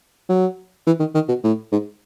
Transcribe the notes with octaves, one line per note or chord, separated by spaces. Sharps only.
F#3
E3
D#3
D#3
B2
A2
G#2